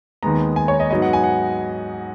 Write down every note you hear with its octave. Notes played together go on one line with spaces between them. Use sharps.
D#2 D#3 G#3 B3 A#5
G#5
C#5
D#5
G#2 F#3 B3 D#5
F#5
G#5
F#5